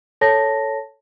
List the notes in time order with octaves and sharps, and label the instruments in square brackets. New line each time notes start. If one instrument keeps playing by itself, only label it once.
[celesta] A4 C#5 A5 A#6